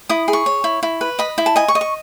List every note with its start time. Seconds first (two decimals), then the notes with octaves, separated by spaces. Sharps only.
0.09 E4 D#6
0.28 G#4
0.33 C#6
0.46 C#5
0.64 E4
0.83 E4
1.01 B4
1.19 D#5 B5
1.38 E4
1.46 A5
1.56 D#5 G#5
1.68 C#6
1.75 D#5
1.81 C#6